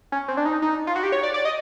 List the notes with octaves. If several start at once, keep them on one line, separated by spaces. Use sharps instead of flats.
C#4
C4
D4
D#4
D#4
F4
F#4
G4
C#5
D5
D5
D#5